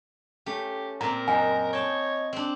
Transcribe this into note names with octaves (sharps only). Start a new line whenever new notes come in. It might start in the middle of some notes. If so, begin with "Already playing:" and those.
A3 C#4 G4
A#2 C4 A#4 A#5
F#2 D#5 G#5 A#5
C#5 G5 A5
C4 D4